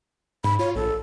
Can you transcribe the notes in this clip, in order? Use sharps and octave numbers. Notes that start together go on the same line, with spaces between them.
G#2 B5
F4 C#5
A#1 A4